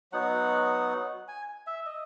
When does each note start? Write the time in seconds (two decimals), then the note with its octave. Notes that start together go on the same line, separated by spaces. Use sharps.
0.12 F#3 B3 D#4 F#4 F#5
1.28 G#5
1.67 E5
1.86 D#5